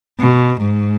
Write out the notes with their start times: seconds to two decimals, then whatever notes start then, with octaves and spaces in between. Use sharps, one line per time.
0.20 B2
0.61 G#2